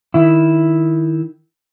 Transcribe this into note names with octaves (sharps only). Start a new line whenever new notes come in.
D#3 E4